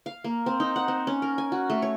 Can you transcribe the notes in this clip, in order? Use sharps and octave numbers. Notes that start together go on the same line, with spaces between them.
F5
A#3
C4
D#4
F#5
C4
C#4
A#4
G#5
F#4
A3
C#5